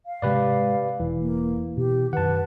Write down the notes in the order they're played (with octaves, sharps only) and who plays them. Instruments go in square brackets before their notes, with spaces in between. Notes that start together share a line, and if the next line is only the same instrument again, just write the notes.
[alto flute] F5
[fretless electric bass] G#2 C3 G#3 [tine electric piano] G4 B4 D5
[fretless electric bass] E1 [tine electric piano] E3
[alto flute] A#3
[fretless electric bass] B2 [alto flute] G4
[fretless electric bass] F#2 D#3 [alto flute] B4 [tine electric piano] F#5 A5